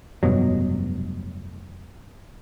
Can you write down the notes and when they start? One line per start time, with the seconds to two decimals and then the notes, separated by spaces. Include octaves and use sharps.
0.23 F1 G2 B2 F#3